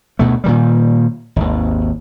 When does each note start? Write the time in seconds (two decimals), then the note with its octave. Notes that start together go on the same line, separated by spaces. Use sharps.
0.19 D2 B2 A3
0.44 A#2 D#3 G3
1.36 G#1 D#2